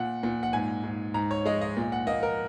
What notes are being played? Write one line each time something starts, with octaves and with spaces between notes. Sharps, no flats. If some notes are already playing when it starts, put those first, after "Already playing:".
Already playing: A#2 F#5
A#2
F#5
G#2 G#5
G#2
G#2 A#5
C#5
G#3 D#5
D#5
A#2
F#5
A#3 D#5
A#4